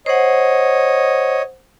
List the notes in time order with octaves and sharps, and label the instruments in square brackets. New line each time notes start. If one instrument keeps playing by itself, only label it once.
[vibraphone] C5 F#5 [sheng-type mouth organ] C#5 D#5